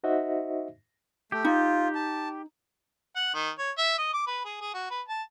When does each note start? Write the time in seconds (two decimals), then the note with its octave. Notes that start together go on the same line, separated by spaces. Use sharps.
0.04 D#4 F#4 C5 D#5 E5
1.32 A3 G4
1.45 D#4 F4
1.95 A5
3.16 F#5
3.34 D#3
3.59 C#5
3.78 E5
3.98 D#5
4.13 D6
4.27 B4
4.45 G#4
4.61 G#4
4.74 F#4
4.91 B4
5.08 A5